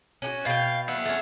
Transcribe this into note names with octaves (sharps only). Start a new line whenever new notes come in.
C#4 D4 F#4
B2 F5 G5
E5 F#5
A3 C#4